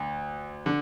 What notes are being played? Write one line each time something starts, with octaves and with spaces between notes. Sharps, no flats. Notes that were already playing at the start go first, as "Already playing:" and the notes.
Already playing: D2
D3